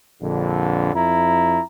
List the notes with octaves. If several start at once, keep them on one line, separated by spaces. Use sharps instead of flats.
A#1 F2 D3
F2 E4 A#5